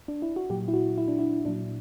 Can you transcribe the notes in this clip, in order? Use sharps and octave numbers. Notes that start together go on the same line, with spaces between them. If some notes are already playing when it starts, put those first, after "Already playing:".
D4
E4
F#4
A#2 F#3 G4
E4
F#4
E4
D4
E4
A#2 F#3 D4